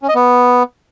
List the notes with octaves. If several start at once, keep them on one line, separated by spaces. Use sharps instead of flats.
C#4
D#5
B3